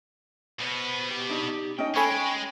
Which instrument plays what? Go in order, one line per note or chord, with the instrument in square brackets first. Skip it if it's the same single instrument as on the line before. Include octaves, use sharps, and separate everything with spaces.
[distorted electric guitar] B2 B3 [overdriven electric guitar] C5 B5
[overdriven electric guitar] G4
[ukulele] D4 D#4 D5
[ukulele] C#4 D#4 D#5 [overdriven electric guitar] G5
[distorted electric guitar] G#3 [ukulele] C#4 A4 C#5 [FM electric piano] G#5 B5 C#6